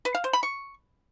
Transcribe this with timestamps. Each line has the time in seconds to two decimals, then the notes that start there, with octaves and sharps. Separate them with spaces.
0.05 B4
0.15 F5
0.24 C5
0.33 B5
0.43 C#6